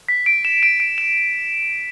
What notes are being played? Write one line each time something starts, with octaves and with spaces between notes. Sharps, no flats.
B6
D7
E7
D7
D7
E7